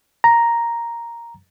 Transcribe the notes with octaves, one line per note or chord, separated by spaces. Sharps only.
A#5